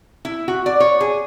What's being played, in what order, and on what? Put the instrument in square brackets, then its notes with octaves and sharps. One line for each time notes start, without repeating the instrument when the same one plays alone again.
[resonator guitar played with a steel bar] E4
F#4
D5
C#5
G#4